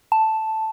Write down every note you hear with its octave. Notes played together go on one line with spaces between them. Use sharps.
A5